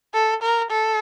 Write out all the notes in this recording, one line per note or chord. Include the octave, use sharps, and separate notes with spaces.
A4
A#4
A4